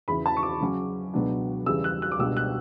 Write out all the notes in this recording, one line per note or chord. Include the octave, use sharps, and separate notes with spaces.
E2 C#3 E3 B5
A5
C#6
D6
C#3 F#3 C#4
C#2 B2 F#3 B3 D4
E2 C#3 G3 C#4 E6
F#6
F#6
D6
C#2 B2 G3 D4 E6
F#6